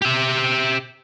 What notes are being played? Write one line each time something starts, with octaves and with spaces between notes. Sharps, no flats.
G4 E5